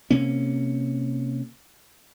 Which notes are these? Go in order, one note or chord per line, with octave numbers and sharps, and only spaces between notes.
C3 A#3 C#4